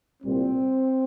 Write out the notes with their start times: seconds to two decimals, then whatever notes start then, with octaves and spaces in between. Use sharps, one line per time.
0.22 C2 A#2 G3 C4